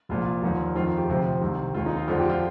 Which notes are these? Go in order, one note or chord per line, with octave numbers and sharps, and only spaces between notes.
C2 A#2 F3 F4
D#2 D3 F3
F2 D#3 F4
F4
G4
D2 C3 F3
C2 C3 D#3
D#2 D#3 F4
D#4
F4
F2 D3 F3 F4
G4
F4